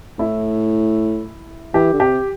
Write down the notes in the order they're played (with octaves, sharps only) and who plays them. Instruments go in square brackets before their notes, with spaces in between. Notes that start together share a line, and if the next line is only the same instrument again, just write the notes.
[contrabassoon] A2 [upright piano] E4
[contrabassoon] E3 [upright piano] G4
[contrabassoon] D3
[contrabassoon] C3 [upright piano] G4